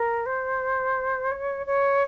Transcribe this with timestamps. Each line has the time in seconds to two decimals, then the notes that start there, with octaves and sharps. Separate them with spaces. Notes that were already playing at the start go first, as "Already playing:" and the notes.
Already playing: A#4
0.26 C5
1.32 C#5
1.67 C#5